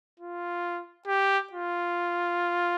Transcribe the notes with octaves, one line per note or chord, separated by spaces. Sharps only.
F4
G4
F4